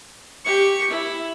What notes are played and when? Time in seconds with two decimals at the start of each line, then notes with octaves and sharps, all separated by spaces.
0.45 G4 C#6
0.90 E4